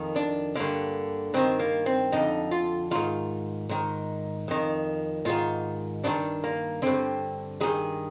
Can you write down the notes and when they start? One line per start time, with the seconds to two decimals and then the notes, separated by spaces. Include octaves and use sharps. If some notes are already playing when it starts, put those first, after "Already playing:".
Already playing: F2 D#3
0.16 D4
0.55 G2 D3 A#3
1.34 G2 D#3 C4
1.59 A#3
1.86 C4
2.12 F2 D3 D#4
2.51 F4
2.91 G#2 D#3 F4
3.69 G#2 D#3
4.48 F2 D#3
5.25 G#2 D#3 F4
6.04 G2 D#3 D4
6.44 A#3
6.82 G2 D3 C4
7.61 G2 D#3 G#4